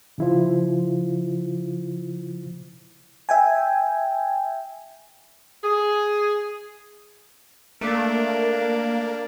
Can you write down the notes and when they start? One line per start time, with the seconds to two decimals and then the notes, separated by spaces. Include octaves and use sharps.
0.18 C#3 F3 E4 F4 C5
3.29 E5 G5 G#5
5.63 G#4
7.81 A3 A#3 D4 A#4